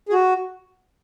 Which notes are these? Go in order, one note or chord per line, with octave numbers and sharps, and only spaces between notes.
G#4
F#4